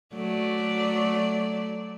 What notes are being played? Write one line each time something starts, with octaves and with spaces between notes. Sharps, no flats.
F#3 A3 D5